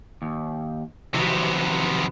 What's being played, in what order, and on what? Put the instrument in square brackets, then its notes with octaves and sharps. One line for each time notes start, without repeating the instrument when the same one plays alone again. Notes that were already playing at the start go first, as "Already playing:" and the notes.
[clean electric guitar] D#2
[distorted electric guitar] C3 B3 [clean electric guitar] D#3 F3 F#3